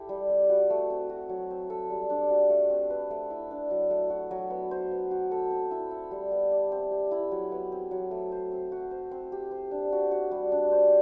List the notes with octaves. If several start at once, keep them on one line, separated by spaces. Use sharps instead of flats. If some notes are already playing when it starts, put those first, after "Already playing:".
Already playing: E4 G4 A4
G3
C4
F#4
A3
C4
F#4
F#3
C4
A4
G3
D4
F#4
A3
C4
B4
A3
E4
D4
F#3
A3
F#4
F#3
B3
C5
B3
F#4
A4
C4
E4
E4
G3
B3
D5
C4
G4
E4
F#3
B3
C4
F#3
A3
C5
C4
F#4
C5
C4
G4
C5
D4
F#4
F#4
G3
D4
C5